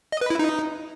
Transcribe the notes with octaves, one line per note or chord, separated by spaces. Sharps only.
D#5
B4
E4
D#4